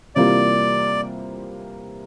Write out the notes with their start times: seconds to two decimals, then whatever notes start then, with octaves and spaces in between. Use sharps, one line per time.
0.15 C3 E3 G3 A#3 F4 D5